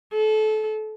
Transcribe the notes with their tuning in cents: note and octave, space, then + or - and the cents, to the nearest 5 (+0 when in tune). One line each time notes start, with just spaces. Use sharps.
A4 -30